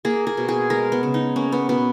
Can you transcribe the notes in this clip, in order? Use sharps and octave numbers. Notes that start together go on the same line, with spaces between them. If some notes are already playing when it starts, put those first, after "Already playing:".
A#3 G#4
G#4
B2
G#4
G#3 A#4
B3
C#3
D#4
A#3 C#4
B3
B2 B3